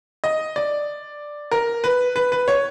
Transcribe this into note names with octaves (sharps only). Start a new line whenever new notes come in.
D#5
D5
A#4
B4
B4
B4
C#5